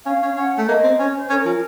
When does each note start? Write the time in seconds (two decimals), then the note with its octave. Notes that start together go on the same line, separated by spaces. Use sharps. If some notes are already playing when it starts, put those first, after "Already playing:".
0.06 C#4 F5
0.22 C#4
0.37 C#4 F#5
0.58 A3
0.68 A#3 D#5
0.84 C4
0.99 C#4
1.15 C5
1.30 C#4 A#4
1.46 F3